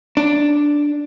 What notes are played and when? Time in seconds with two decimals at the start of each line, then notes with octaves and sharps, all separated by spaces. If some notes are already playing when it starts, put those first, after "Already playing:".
0.17 D4